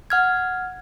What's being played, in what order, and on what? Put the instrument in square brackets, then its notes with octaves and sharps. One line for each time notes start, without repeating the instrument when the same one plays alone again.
[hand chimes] F#5 F6 G#6